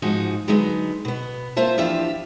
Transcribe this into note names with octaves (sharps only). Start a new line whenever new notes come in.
G#2 F3 D#4 F#4 G#4
D3 F#3 G#3 B3 D#4
B2 B3
A#3 F4 C5 E5 A5
E2 F3 D4 F4 G4 E5